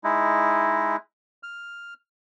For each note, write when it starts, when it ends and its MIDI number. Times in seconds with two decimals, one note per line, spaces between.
0.04 0.96 56
0.04 0.96 63
0.04 0.96 64
1.43 1.94 89